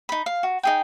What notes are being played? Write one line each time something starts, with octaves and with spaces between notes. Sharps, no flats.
D#4 B5
F5
F#4
D#4 G#4 G5